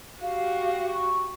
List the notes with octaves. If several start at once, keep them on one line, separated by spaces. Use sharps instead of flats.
F#4 G4 F5
C#6